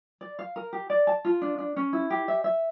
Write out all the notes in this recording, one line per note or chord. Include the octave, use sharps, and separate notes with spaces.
D5
F5
A#4
G4
D5
A5
F4
D4
D4
C#4
E4
G4
E5
E5